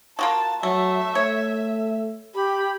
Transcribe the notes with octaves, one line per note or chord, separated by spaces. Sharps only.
A#3 F4 F#4 A5
F#3 A3 E5
A3 C#5
G4 B5